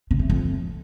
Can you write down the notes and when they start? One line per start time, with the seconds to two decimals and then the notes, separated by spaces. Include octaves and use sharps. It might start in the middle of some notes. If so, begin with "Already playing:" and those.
0.11 C#3
0.19 E3
0.30 F2